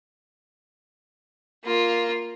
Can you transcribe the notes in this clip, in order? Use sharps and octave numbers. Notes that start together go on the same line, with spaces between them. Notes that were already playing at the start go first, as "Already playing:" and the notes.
A#3 F4